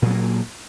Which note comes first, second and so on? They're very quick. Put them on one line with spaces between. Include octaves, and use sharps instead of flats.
A#2 F#3 B3 A#3